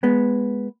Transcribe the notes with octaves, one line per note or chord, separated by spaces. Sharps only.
G#3 B3